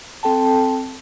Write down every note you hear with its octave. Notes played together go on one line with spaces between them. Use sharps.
C4 A4 G5 A5